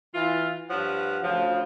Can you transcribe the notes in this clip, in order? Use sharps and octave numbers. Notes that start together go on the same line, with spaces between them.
E3 F4
G2 F3 B4 C#5 F#5
D2 C#3 F3